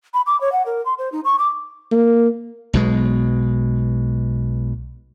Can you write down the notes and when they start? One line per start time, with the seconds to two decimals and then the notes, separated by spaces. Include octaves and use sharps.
0.14 B5
0.26 D6
0.41 C#5
0.52 F#5
0.66 A#4
0.85 C6
0.98 C5
1.12 D#4
1.25 C#6
1.38 D6
1.91 A#3
2.73 B1 B2 G#3